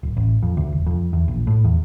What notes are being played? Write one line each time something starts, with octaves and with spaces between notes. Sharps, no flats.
D1
A1
F2
D2
E1
F2
E2
A#1
A2
E2